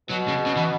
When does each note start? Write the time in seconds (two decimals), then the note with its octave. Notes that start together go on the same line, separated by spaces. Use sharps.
0.10 B2 F#3
0.28 C#3
0.46 C#3
0.56 E3